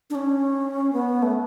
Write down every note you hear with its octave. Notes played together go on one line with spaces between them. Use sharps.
D4
C#4
B3
A3